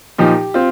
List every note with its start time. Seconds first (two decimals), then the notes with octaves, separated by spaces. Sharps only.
0.18 A#2 F3 D#4 G4
0.54 C4 F4